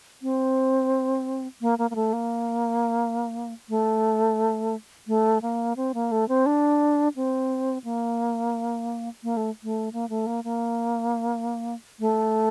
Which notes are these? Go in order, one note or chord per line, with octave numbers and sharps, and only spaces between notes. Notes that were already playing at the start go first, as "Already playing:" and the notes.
C4
A#3
A#3
A#3
A3
A#3
A3
A3
A#3
C4
A#3
A3
C4
D4
C4
A#3
A#3
A3
A3
A#3
A3
A#3
A#3
A3